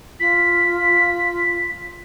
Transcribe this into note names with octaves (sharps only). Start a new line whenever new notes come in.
F4 B6